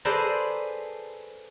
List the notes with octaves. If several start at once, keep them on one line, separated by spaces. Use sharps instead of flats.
G#4 A4 B4 C5 D5 A#5